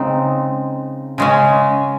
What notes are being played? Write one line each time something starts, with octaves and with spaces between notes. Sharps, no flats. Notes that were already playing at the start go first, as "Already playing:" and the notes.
Already playing: C#3 G#3 C4 D#4
C#3 G#3 C#4